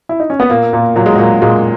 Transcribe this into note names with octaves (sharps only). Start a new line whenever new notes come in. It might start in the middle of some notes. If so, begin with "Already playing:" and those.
E4
D#4
C#4
B3
A#2 A#3
A#2
A#2 F#3
G#3
A#2 F#3
A#2 G#3